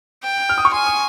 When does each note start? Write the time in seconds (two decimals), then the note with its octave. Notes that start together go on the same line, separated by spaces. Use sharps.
0.23 G5
0.49 F6
0.58 D#6
0.65 C#6
0.72 G#5 C6
0.86 D#6